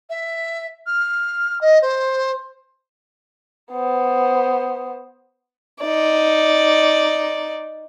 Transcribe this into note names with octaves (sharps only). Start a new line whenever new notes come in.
E5
F6
D#5
C5
B3 C5
D#4 D5